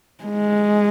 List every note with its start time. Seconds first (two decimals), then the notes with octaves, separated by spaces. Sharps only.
0.24 G#3